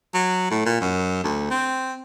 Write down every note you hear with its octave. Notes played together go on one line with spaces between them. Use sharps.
F#3
A2
A#2
F#2
D2
C4